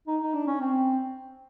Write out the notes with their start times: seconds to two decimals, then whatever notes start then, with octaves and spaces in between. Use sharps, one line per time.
0.08 D#4
0.22 D#4
0.34 D4
0.47 C#4
0.61 C4